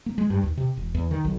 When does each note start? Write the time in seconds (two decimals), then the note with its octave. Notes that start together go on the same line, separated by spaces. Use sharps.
0.06 A#3
0.18 G#3
0.30 G2
0.43 D#2
0.57 C3
0.77 E1
0.94 E2
1.11 D#3
1.24 B1